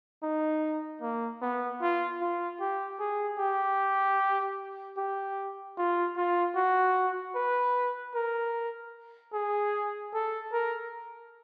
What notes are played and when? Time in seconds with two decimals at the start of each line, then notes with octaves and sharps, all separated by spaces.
0.23 D#4
1.02 A#3
1.42 B3
1.82 F4
2.21 F4
2.60 G4
3.00 G#4
3.39 G4
4.98 G4
5.78 F4
6.17 F4
6.56 F#4
7.35 B4
8.15 A#4
9.34 G#4
10.14 A4
10.53 A#4